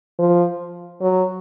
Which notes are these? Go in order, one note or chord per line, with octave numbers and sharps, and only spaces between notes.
F3
F#3